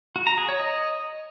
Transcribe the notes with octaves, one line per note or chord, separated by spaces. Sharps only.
F#4
A#5
G#4
C#5
D#5